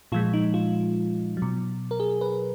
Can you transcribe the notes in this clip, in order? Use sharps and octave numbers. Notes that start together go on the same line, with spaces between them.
A#2 F3 G#3 F4
D#4
F4
F#3
B2
A#4
G#4
B4